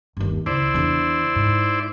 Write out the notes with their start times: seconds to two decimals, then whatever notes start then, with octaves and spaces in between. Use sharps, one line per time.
0.17 G1 D#2
0.46 C#2 E4 C5 D5
0.74 E2 D3
1.36 G#2